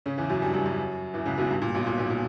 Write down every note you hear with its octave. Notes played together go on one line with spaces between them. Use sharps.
C#3 C#4
E2 E3
F#2 F#3
G2 G3
G2 G3
F#2 F#3
E2 E3
C#2 C#3
B1 B2
G2
A#2
B1 B2
A#2
B1 B2
A#2